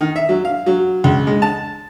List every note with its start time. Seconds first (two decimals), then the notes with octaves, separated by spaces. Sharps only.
0.01 D#3
0.16 E5
0.29 F#3
0.45 F5
0.66 F#3
1.04 C#2
1.27 G#3
1.42 A5